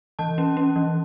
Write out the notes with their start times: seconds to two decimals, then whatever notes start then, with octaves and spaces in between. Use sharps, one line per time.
0.19 E3 A5
0.38 C#4
0.57 C#4
0.76 E3